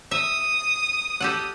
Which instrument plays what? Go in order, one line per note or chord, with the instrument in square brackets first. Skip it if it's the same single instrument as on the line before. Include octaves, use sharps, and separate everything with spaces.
[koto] E5 [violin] D#6
[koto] G4 A4 F#5